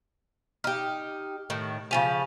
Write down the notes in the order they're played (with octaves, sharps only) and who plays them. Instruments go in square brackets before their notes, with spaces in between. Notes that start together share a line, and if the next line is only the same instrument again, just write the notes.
[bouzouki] D#4 G4 [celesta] F6
[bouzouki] A2 D#3
[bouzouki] C#3 F3 G4 [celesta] G#5 D#7 F7